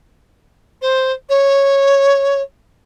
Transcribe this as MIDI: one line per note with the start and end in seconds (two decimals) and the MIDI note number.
0.81 1.12 72
1.29 2.42 73